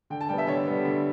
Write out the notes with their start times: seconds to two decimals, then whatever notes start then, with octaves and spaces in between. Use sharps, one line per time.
0.10 D3 G5
0.21 A5
0.29 G3 B3 G5
0.38 E5
0.47 D3 C#5
0.66 G3 B3
0.85 D3